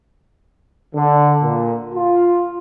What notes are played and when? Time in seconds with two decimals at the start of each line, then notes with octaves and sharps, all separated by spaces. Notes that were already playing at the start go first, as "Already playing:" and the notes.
0.94 D3
1.43 A#2
1.94 F4